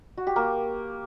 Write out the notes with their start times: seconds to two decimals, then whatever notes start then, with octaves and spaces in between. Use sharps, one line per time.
0.17 F#4
0.27 G4
0.36 A#3